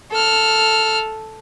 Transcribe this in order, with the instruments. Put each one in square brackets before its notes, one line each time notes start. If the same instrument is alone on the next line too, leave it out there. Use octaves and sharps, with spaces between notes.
[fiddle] A4 F6